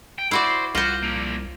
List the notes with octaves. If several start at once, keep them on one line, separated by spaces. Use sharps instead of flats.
G5
E4 F#4 C5 D5
C2 F4 F#4 C5
A#3 D4